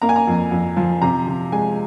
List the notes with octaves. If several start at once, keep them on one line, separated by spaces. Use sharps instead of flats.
A#3 A#5
G#5
A#5
F2
F2
F3
C3 A#5
C3
G#3 G#5